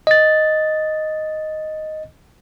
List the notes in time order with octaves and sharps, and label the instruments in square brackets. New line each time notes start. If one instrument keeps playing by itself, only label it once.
[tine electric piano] D#5 A6